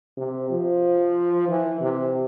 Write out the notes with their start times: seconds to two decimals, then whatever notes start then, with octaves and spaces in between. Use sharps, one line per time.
0.17 C3
0.50 F3
1.48 E3
1.81 C3